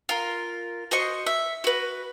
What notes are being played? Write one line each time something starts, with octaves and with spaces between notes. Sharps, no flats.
F4 A#4
F#4 C5 D#5 C#6
E5
F#4 B4